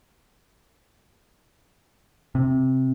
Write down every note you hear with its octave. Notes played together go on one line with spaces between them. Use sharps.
C3